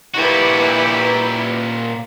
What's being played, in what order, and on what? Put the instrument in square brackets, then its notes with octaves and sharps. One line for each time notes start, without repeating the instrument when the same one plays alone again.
[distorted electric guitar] A#2 F#4 [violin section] E4 G4 B4